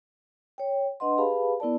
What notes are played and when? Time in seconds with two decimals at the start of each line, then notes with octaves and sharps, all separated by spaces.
0.58 C#5 G5
1.00 D4 B4 D#5 F#5 C6
1.18 G4 G#4 B4 F5 A5 B5
1.60 B3 E4 A#4 D5 A5